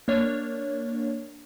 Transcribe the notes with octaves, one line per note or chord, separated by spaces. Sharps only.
A#3 D4 C#5